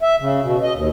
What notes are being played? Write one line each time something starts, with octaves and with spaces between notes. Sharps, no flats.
E5
C#3
B2
D#5
D#2